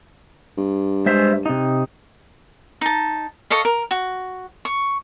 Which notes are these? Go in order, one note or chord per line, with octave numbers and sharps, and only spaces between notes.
G2
G#3 C5 E5
C3 D#4
D#4 A5
A4 C#5 D#5 F5
A#4
F#4
C#6